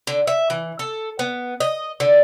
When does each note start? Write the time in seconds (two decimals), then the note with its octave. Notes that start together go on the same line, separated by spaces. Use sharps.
0.07 D3
0.27 E5
0.50 E3
0.79 A4
1.19 B3
1.60 D#5
2.00 D3